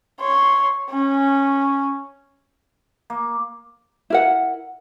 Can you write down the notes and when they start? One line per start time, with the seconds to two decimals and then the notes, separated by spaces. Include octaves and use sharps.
0.21 C#5 C6
0.90 C#4
3.10 A#3
4.10 E4 A#4 F#5